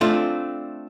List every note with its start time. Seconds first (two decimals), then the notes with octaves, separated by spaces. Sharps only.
0.01 A3 C4 D4 F4